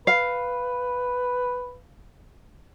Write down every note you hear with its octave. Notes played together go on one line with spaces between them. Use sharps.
B4 F5